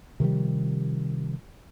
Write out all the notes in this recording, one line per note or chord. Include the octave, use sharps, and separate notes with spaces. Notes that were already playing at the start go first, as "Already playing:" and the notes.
C3 D#3 F3 G3